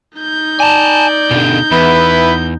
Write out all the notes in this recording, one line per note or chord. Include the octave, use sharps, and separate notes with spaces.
D#4 G6
D5 G#5 A5
B2 D3
E2 B3 E4 B4